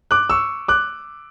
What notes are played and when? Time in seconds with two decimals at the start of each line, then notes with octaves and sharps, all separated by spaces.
0.11 D6 F#6
0.30 C#6 E6
0.68 D6 F#6